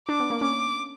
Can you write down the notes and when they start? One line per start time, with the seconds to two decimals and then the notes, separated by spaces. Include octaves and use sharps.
0.08 D4 D6
0.20 B3
0.30 A#3
0.41 C#4 D6